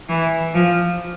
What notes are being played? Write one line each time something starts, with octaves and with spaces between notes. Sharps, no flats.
E3
F3